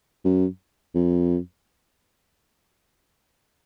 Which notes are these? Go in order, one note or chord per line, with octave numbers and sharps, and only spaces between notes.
F#2
F2